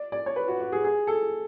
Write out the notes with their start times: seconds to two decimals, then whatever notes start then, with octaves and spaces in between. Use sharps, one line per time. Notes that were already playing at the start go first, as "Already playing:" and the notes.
Already playing: D5
0.12 D5
0.26 C#5
0.36 B4
0.48 F#4
0.60 F#4
0.72 G#4
0.84 G#4
1.07 A4